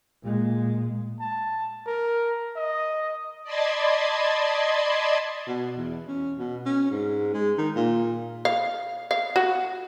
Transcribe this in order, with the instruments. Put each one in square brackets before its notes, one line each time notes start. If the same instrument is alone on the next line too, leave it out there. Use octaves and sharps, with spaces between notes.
[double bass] A#2 G#3
[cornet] A5
A#4
D#5
[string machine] D5 D#5 A5 B5 C6 G#6
[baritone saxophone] B2
E2
C#4
B2
C#4
G#2
G#3
D#3
A#2
[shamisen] F5
F5
F#4